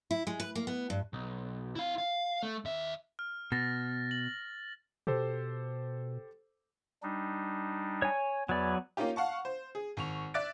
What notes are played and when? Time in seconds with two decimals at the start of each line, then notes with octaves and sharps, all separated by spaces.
0.11 E4
0.27 G#3
0.40 B4
0.55 A#3
0.67 B3
0.90 G2
1.13 B1
1.75 E4 F5
1.98 F5
2.43 A3
2.65 D#2 E5
3.19 F6
3.52 B2 A6 A#6
4.11 F#7
5.07 B2 G4 A4 C5
7.03 G3 D4 D#4
8.02 C#5 G#5
8.49 E2 F#3 B3 D5 G#5
8.97 A#3 C#4 D#4 F4 G4
9.16 F5 F#5 A5 C#6
9.45 C5
9.75 G#4
9.97 G#1 C#6 F7
10.34 D5 E5 D6 F#6 A6 D7